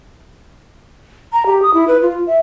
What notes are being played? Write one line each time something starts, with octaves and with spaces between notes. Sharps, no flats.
A#5
G4
D#6
E4
B4
F4
E5